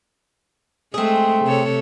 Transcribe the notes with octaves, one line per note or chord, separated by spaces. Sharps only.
G#3 A3 C4 G#4
C3 A4 C#5